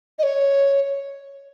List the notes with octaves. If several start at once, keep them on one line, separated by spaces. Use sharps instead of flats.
D#5
C#5